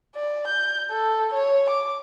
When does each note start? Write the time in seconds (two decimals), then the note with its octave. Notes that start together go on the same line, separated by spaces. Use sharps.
0.15 D5
0.47 G6
0.91 A4
1.33 C#5
1.70 D6